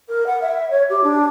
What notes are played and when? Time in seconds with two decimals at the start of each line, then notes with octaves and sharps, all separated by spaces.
0.08 A#4
0.26 F#5
0.41 E5
0.70 C#5
0.89 G4
1.03 D4